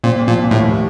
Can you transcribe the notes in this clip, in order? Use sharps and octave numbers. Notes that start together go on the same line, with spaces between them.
A#2 C4
A#2 F3
D#2 A2